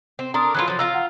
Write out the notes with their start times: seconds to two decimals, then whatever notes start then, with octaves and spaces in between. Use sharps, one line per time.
0.19 C4
0.34 D4 A#4 A#5 C6 D#6
0.55 E3 F#3 F4 F#6
0.68 F3 F#3
0.79 F4 F5 A#5 E6
0.95 F#5